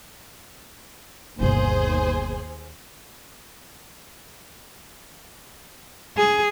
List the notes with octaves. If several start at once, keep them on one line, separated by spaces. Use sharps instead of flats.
G1 D#2 B2 G#4 C5
G#4